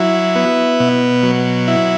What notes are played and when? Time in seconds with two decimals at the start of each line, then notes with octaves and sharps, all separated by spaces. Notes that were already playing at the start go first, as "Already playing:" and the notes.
Already playing: F#3 E4
0.35 B3
0.80 B2
1.23 F#3
1.68 E4